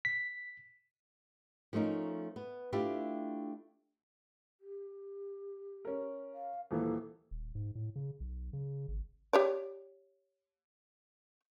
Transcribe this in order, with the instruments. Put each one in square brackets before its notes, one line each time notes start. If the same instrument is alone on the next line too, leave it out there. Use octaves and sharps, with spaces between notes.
[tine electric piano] B6
[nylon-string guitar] F3 A3 C#4 D#4 A#4
B3
A3 D4 E4 F4 G4
[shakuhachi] G4
[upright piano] C#4 A#4
[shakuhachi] F5
[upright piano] D#1 E3 A#3 [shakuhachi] A4
[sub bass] D#1
G#2
A2
C#3
B1
C#3
G#1
[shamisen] G4 C#5 D5